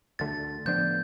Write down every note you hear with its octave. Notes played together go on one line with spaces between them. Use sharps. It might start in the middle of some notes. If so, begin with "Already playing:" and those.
D2 D3 A3 A6
A2 F3 B3 D4 G6